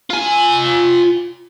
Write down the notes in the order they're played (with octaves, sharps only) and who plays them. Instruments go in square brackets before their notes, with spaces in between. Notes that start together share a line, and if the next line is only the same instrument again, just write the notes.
[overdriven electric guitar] F4 G#5